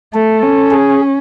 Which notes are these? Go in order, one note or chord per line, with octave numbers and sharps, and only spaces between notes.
A3 A4
C#4
G#4